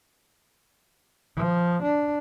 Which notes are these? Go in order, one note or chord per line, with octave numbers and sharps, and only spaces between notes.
F3
D4